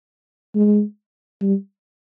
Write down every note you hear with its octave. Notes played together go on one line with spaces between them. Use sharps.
G#3
G3